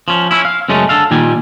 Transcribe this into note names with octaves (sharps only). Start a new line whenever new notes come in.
F3 C#4
C#4 E4
F5
F#2 C#3 G#3 A3 C#4
D3 A4 F5
A#2 D#3 G3 G#5